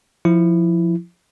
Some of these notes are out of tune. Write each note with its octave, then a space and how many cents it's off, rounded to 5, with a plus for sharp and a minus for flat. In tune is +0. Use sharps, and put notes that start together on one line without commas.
F3 +0 E4 +5